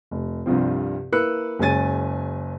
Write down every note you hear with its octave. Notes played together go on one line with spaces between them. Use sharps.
F1
C2 G2 C3 F3 C4
A#3 E4 B4 E6 F#6 C#7
F#1 G#3 C#4 G#5 A6 D#7